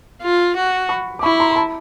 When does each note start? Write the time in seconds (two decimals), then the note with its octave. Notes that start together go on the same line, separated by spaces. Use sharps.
0.23 F4
0.56 F#4
0.89 B5 C#6
1.19 D6
1.23 E4 B5 C#6
1.40 A#5 C6
1.51 C6
1.56 A5 B5